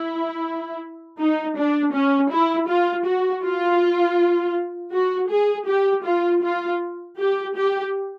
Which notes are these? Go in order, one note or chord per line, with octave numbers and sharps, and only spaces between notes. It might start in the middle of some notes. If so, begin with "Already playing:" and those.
Already playing: E4
D#4
D4
C#4
E4
F4
F#4
F4
F#4
G#4
G4
F4
F4
G4
G4